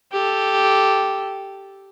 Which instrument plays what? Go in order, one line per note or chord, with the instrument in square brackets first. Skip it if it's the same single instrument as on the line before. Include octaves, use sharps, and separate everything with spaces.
[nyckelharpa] G4 A4